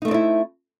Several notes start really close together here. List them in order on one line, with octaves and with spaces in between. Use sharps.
D#4 A3 C4 D5 E4